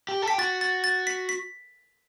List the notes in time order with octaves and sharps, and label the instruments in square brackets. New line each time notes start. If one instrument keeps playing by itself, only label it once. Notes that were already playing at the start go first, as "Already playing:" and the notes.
[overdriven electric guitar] G4
A4
[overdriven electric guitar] G4 [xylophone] B6
[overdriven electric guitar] F#4 [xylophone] A6
[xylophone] A6
A6
B6
B6